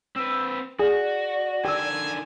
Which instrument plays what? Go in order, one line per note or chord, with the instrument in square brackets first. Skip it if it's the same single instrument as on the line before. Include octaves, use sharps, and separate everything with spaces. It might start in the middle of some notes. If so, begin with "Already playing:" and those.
[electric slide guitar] C4 B4 [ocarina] E6
[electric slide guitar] F#4 [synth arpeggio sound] G#4 [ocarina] D5
[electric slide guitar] D3 D#3 A4 [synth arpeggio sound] G4 E6 [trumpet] G#5